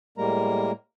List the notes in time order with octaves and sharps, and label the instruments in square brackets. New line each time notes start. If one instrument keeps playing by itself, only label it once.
[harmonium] A2 G3 G#3 A#3 A#4 A#5